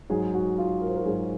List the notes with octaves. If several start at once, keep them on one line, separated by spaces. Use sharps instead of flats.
G#2 F#3 G#4
F#4
F4
A#4
C5
A#4
F#4
G#2 F#3 G#4